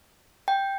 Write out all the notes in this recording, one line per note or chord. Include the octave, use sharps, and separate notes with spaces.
G5